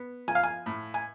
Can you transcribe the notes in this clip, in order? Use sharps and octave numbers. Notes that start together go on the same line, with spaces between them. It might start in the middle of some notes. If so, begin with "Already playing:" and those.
Already playing: B3
F3 G#5
F5
G#5
A2
G#5